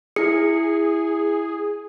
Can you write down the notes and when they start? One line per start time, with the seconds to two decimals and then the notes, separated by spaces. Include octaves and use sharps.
0.16 E4 G#4 C#7